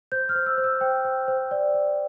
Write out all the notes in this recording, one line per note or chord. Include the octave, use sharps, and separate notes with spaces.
C5 G6
F6
C5
E6
C5
E6
C5 G5
C5
C5
D5
D5